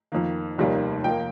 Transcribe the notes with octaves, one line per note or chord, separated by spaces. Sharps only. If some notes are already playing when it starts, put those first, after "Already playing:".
F2 D#3 A#3
F1 D#2 D#3 G3 A#3
F2 F3 A#3 G5